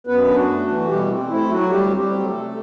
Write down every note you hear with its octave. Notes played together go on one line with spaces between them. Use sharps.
F#2 B3 B4
D4
F#4
A3
F#4
E3
B2 G3 G4
C4
A3 E4
F#3 F#4
D2 G3 G4
C4
G3 G4
F#3
A3 A4
C3